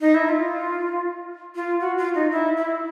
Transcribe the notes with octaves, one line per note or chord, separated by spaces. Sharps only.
D#4
E4
F4
F4
F#4
F4
D#4
E4
E4